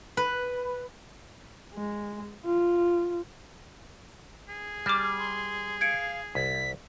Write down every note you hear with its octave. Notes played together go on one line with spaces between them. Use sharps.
B4
G#3
F4
G#4
G3 D6 F6
C6
F5 G#6 C#7 D7
C2 B6